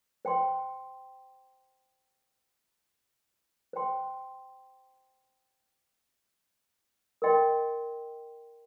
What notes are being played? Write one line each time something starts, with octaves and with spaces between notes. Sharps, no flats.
C5 G5 C6
C5 G5 C6
A#4 D#5 G5 C6